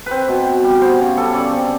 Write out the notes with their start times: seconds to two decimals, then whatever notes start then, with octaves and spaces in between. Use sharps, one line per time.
0.06 C4 B4 C5
0.28 B2
0.46 C4
0.64 G3
0.81 B3 C5
0.99 C#3
1.17 G3 A4
1.34 C#3 D5
1.52 C4